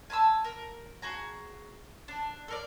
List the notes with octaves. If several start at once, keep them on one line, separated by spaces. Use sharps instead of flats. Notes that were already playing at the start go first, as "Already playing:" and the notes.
G#5 A5 B5 E6
A#4
F#4 G#4 A#5
D4
A4 A#4 D5